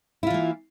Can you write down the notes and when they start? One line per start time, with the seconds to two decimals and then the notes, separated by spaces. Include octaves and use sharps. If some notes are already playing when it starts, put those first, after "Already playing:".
0.23 E4
0.27 F4
0.30 E3
0.34 A#3